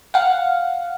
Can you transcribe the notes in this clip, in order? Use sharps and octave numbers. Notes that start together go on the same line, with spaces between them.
F5 F#5